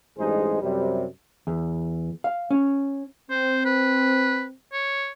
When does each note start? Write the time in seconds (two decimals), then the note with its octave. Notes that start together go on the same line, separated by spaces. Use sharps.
0.18 A1 G2 G#3 D#4 G#4 C5
0.62 F#2 C3 G3
1.47 E2
2.24 F5
2.51 C#4
3.31 C4 C5
3.65 B4
4.73 C#5